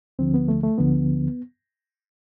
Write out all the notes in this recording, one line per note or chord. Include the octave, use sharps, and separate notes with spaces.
D2 D3 F3 C4
B3
A3
A3
D2 D3 F3 B3